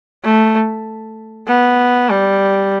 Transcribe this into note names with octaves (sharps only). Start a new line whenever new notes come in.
A3
B3
G3